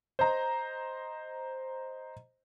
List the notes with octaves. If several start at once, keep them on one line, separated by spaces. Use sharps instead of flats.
C5 D#5 A#5